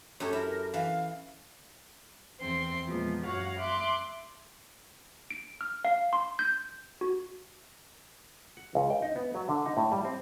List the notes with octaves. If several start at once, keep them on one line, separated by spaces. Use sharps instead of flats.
F#2 G4 A4 C#5
E4 A#4
E3 F5
E2 C4 C6
E2 A#2 F3 G#3 A#3 B3
F#2 F#4 C#5 F5 F#5
E5 C6 D6 F#6
D7
F6
F5
C6
G6
F#4
F#5
C#2
G5
D#4
B3
F#3
D3
D#4
A2
G3
C4